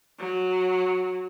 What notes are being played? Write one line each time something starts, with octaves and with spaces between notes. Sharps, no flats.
F#3